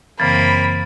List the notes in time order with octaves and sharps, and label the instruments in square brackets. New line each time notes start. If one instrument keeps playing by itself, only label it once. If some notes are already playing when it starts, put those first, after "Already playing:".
[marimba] F#2 C#3 E3 [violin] A#3 C4 [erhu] B5 [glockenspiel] A6